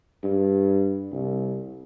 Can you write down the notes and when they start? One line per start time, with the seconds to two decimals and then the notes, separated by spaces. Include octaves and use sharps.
0.24 G2
1.12 C2